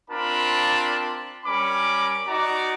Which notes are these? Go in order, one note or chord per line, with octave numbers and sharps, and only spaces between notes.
C4 D4 F4 A#4 A5 B5
G3 C#4 A#4 B5 D6
D#4 F#4 D5 A#5 D6